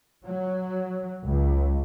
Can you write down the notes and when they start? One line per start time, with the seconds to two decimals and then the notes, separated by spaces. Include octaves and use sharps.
0.25 F#3
1.25 C#2